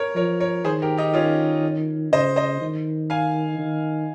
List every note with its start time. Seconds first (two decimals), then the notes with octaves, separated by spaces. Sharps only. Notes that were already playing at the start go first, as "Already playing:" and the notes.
Already playing: A#4 C#5
0.16 F3 A#4 C#5
0.40 A#4 C#5
0.65 D#3 G#4 C5
0.82 G4 A#4
0.97 D#4 G4
1.14 C#4 F4
2.12 C#3 C5 D#5
2.36 C5 D#5
2.61 D#3
3.10 F5 G#5
3.59 D#3